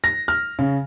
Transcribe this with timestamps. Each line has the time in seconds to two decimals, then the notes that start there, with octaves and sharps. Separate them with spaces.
0.04 A#6
0.28 F6
0.59 C#3